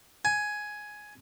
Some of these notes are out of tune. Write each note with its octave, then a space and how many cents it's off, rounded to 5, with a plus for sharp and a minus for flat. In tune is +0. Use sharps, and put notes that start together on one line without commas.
G#5 +10